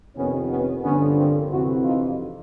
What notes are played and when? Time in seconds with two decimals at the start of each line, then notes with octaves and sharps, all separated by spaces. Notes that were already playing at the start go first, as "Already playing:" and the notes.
0.16 F2 C3 D#3 B3 C#4
0.50 B3 C#4
0.83 G2 D3 F3 B3 C#4
1.17 A#3 C4
1.51 F2 C3 E3 E4 F#4
1.84 D#4 F4